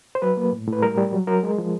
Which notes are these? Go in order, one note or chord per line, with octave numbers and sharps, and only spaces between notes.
C5
F#3 B4
A#3
A2
A2
B4
G3 A#4
G3
F#3
F#3 A#4
G#3
F3